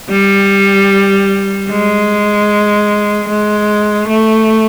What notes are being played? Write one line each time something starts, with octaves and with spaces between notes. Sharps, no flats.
G3
G#3
G#3
A3